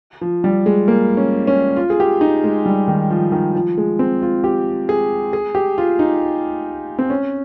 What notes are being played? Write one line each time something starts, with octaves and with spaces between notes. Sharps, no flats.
F3
G3
G#3
A#3
C#4
C#4
F4
G#4
G4
D#4
G#3
G3
D#3
F3
D#3
F3
G#3
C4
F4
G4
G#4
G#4
G4
F4
D#4
C4
C#4